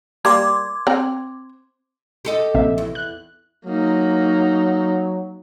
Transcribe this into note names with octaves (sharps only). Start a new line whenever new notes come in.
G3 A#3 A#5 C6 D6 G#6
C4 A#5
G4 A4 D#5
A#1 C3 E5
E2
F#6
F#3 A#3 D#4